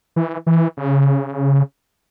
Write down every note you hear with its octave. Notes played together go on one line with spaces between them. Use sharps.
E3
E3
C#3